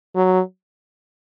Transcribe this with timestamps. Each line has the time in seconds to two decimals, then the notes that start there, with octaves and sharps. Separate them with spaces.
0.16 F#3